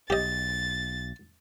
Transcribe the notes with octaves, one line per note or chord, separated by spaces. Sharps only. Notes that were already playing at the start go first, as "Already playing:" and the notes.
B1 G4 D#5 A6